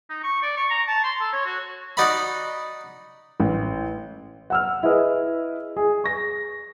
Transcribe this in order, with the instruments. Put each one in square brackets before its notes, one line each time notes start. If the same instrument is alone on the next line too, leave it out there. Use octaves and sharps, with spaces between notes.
[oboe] D#4
C#6
D5
C#6
A#5
A5
C6
A4
C#5
F#4
[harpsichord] D#4 F#4 D5 D#5 B5
[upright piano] A1
F#5 E6 F6
E4 G#4 B4 D#5 E5
G#4
C#6 A#6